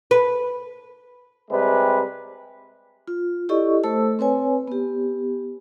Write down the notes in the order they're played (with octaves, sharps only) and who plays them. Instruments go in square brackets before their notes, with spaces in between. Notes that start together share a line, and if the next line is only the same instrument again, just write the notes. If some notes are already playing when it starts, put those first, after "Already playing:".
[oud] B4
[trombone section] C3 G3 G#3 B4
[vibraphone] F4
E4 G4 A4 D5 D#5 C#6
A3 A4 C5 A5 E6
C4 B4 C#5 G#5
B3 G4